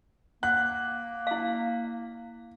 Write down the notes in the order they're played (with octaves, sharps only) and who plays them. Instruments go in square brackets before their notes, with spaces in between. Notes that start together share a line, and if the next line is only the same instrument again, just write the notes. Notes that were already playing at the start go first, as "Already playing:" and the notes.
[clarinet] A#3 [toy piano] F#5 [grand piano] F#6
[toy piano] E4 F5